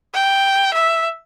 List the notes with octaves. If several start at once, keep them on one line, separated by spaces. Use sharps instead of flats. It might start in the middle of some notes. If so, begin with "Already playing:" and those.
G5
E5